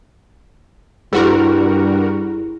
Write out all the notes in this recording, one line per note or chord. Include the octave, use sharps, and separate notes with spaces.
G2 G3 E4 F#4 G#4 A#4